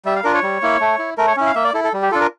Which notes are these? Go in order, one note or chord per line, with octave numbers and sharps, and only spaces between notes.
G3 E5
F5
D4 F4 A#4
C#5
G3
A#3 E4
A3
E4
A3 A#4
C#5
C#4 E4
F5
A#3 E5
D5
E4 A4
A4
G3
G4
D4 F4 A4
A#4